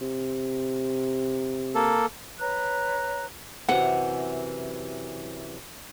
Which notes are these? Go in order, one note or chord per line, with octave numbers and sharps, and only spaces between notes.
C3
A#3 A4
B4 C#5 A#5 F#6
F#2 C3 E3 F#5